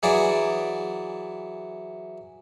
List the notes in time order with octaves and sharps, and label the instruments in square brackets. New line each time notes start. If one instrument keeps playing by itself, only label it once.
[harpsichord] E3 F#3 G#4 D5